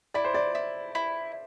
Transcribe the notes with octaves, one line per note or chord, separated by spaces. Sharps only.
E4 D5
C5
D5
E4
E4